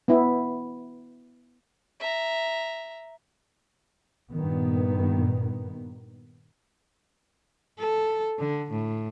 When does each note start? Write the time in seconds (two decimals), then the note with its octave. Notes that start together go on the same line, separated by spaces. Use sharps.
0.08 B3 E4
2.00 E5 A#5
4.32 G2 A#2 D#3 B3
7.78 A4
8.39 D3
8.71 A2